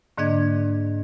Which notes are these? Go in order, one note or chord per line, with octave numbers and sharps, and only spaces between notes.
G#2 D3 A#3 D4 D#5 G#6